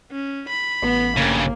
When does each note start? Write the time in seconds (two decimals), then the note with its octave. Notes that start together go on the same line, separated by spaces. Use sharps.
0.12 C#4
0.48 B5
0.82 A1 B3
1.17 G2 C#3 A#3